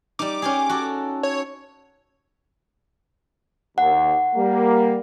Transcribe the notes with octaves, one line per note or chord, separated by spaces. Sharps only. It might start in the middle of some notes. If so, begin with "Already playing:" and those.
G3 D#4 D6
C#4 G4 G#4
F#4 A4
C#5
D#2 F#5
G3 A#3